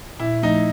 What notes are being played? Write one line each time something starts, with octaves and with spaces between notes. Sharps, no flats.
A#2 E4
F3 A3 D#4